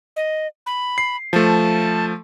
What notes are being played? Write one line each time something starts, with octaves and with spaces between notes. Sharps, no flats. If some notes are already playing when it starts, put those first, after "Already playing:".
D#5
B5
C7
F3 A3 A5